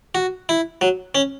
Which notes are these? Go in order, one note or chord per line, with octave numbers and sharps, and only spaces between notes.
F#4
E4
F#3
C#4